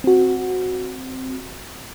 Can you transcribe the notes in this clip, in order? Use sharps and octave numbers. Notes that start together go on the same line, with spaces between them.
C4 F#4